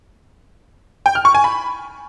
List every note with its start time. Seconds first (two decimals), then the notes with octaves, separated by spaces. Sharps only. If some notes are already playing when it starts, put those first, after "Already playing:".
1.06 G5
1.15 F6
1.25 C#6
1.35 G#5
1.44 B5